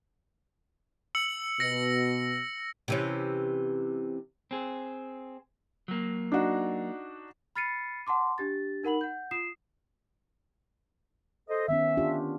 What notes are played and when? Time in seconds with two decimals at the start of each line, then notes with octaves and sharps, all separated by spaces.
1.15 E6 C#7 F#7
1.60 B2 A#6 C#7
2.88 C3 E3 C#4
4.51 C4 G#4
5.88 F#3 A#3
6.32 D4 D#4 F#4
7.56 B5 F6 A6 C7 C#7 D#7
8.07 F#5 A5 C6 D6
8.38 D4 G4 A6
8.84 D#4 A#4 F#5 B5 F#7
9.01 F#5 G6
9.31 F4 D#6 C7 E7
11.49 A4 C5 D#5
11.68 D#3 B3 C#4 E5
11.97 D4 F4 G4